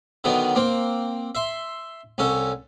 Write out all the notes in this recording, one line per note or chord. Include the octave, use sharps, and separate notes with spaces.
D3 D#3 F#3 B3
A#3 C4
E5 C6
C2 C#4 A4